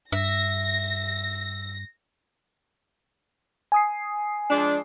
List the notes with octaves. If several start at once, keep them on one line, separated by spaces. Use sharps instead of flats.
G2 E5 A#6
G#5 D#6 C7
F3 G#3 D4